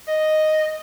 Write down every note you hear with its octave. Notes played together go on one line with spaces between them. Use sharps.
D#5